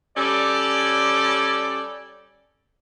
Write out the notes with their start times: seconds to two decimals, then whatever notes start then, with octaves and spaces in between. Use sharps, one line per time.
0.17 G3 C#4 A4 D5